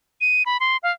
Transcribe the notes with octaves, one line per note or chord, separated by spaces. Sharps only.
D#7
B5
C6
F5